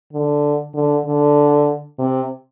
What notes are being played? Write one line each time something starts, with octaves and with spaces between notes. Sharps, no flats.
D3
D3
D3
C3